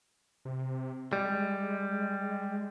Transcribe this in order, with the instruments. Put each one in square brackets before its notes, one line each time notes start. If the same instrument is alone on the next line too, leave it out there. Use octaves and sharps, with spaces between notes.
[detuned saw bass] C3
[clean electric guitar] G3 [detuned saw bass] G#3